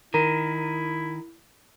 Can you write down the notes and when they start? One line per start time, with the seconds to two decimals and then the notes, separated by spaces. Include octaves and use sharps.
0.14 D#3 E4 A#4 A#5